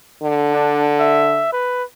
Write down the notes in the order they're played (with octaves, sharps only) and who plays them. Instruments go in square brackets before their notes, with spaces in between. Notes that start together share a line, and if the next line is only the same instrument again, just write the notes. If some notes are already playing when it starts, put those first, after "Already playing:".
[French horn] D3
[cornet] D4
E5
B4